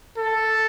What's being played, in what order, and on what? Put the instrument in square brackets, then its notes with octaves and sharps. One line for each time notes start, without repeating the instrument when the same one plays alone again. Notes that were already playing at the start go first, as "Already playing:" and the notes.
[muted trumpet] A4